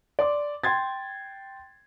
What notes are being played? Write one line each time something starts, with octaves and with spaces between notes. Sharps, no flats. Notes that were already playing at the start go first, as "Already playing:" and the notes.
D5 C6 D6
G5 C6 G#6 A6